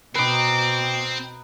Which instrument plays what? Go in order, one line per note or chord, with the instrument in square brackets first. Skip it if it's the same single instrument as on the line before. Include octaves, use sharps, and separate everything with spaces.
[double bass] B2 [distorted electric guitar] C4 [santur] D#4 B4 [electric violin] D6